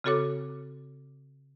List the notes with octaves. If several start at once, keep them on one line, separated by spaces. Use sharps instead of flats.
C#3 C4 F#4 A4 C#5 D6